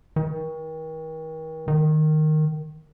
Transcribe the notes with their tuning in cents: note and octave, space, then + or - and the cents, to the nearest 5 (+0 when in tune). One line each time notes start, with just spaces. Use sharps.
D#3 +40
D#3 -10